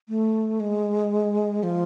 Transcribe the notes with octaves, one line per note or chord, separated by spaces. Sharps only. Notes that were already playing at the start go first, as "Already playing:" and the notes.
A3
G#3
F3